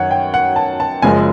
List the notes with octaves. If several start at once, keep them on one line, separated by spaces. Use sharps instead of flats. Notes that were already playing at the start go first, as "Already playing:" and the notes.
Already playing: F#2 D#3 C#5 F#5
G5
F#5
A5
A5
F#1 F#2 C#3 F3 G#3 G#5